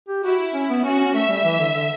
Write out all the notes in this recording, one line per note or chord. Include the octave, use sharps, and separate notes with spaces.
G4
E4 F#4
C#4
B3
C#4 F#4
C#4
A3 E5
G3
E3
D3
D3